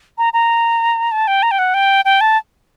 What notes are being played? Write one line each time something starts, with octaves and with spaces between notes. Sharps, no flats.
A#5
A#5
A5
G5
A#5
G5
F#5
G5
G5
A5